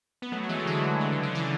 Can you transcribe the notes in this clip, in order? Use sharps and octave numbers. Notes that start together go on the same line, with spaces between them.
B3
F#3 A3
A3
E3 G#3
E3
D3 F#3
D3
C#3
D3
C#3 E3